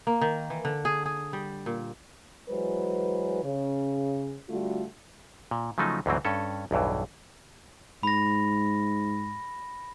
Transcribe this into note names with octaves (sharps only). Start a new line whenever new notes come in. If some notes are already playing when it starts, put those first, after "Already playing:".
A#3
D#3
E3
D3
G#4
G#4
G3
A#2
E3 F#3 G#3 B4 C5
C#3
D3 G3 A3 F4 F#4
A#2
C#3 F3 F#3 A3 D#4
D2 G#2 E3 F#3 C4
G2 C#4 A4
B1 E2 G2 E3
G#2 B5 A#6